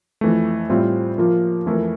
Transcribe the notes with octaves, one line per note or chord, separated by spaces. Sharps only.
F2 E3 A3
A2 G3 C4 F4 C5
F3 A#3 F4 A#4
F2 E3 A3 E4 A#4